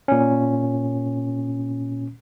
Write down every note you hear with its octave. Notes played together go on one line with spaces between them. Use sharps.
A#2 C#4